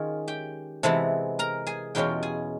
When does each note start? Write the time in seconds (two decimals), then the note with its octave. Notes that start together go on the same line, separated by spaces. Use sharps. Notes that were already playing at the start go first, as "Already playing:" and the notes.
Already playing: D#3 G#3 C#4 F4 G#4
0.28 G4 G5
0.83 C3 E3 G#3 B3 A4 A5
1.39 A#4 A#5
1.67 G#4 G#5
1.95 E2 B2 G#3 C#4 F4 G4 G5
2.23 G#4 G#5